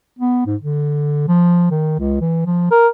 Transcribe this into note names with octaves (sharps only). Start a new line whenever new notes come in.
B3
G#2
D3
F3
D#3
C#2
E3
F3
A#4